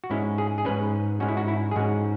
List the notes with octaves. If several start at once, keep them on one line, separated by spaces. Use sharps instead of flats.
F#4
G#2 G#3 C#4 E4
G#4
G#4
G#2 G#3 C#4 B4
G#2 G#3 C#4 F#4
E4
F#4
E4
G#4
G#2 G#3 C#4 F#4